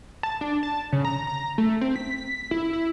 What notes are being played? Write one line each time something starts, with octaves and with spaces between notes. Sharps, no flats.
A5
D4
A5
C#3
A#5
A#5
A3
C4
B6
E4
E4